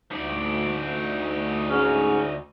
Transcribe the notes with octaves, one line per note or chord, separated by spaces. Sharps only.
D2 D#4 D5
G#2 C#4